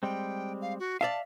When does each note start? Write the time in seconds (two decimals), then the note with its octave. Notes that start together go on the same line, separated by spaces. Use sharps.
0.03 G3 G#3 C4 G5
0.61 F5
0.79 F#4
1.01 D5 E5 F5 A5